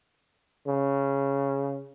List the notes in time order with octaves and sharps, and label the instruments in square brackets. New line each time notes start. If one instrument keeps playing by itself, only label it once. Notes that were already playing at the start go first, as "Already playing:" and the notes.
[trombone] C#3